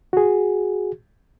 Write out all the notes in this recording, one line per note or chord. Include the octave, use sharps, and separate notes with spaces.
F#4 G#4